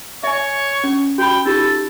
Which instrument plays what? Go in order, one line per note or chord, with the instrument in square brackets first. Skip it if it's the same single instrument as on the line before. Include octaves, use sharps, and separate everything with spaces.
[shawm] C#5 [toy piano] E5 G#5
[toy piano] C#4
[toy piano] F#4 B5 [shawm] G5
[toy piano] D#4 F4 G4 [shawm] A4